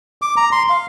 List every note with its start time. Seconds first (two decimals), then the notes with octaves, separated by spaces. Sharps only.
0.22 D6
0.37 A#5
0.52 C6
0.69 F5